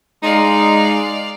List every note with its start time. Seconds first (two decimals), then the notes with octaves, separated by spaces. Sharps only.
0.23 G#3 D#4 D5 F5